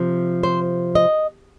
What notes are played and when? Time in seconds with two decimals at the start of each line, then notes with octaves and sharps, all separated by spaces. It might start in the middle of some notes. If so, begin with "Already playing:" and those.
Already playing: C3 F3
0.43 C5
0.95 D#5